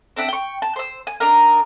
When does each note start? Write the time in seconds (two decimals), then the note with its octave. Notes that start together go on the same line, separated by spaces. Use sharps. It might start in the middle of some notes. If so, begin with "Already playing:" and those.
0.17 C4 D4 E5 F#5
0.28 G5 C#6
0.62 A5
0.76 C5 E6
1.07 G#5
1.20 D4 D#4 A#4